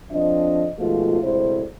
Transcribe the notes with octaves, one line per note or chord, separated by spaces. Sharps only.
F2 F3 C4 D4 D#5
G#2 B2 F3 G#3 A3 F4
D2 A2 C3 G#3 E4 C5